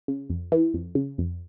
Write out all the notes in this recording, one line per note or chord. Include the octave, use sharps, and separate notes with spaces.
C#3
F2
E3
F2
C#3
F2